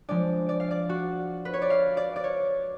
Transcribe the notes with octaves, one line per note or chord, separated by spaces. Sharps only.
F3 G#3 D4 D5
D5
F5
D5
F#4
B4
C#5
D5
F5
D5
D5
C#5